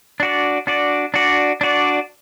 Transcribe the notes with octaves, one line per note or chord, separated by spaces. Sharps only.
D4 F#4 D5
D4 F#4 D5
D4 F#4 D5
D4 F#4 D5